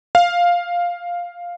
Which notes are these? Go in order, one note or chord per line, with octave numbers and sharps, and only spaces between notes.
F5